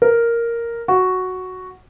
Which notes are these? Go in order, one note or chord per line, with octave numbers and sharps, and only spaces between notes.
A#4
F#4